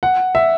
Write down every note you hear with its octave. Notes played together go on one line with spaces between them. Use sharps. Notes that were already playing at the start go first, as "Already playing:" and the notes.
F#5
E5